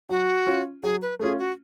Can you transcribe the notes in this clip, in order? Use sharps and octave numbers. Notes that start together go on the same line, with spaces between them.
F#3 F#4
C#4 F4
F#3 G#4
B4
A3 C#4 F4 G#4
F#4